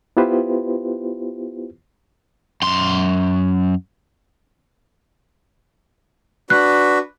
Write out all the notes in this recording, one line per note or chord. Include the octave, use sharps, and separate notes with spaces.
B3 E4 F4 G4 B4 C5
F#2 C6
D4 F#4 B4 F#6